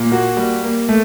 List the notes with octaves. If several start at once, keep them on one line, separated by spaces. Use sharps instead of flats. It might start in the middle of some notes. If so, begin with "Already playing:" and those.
Already playing: A#2
A#3 F#4
G3
A#3
A3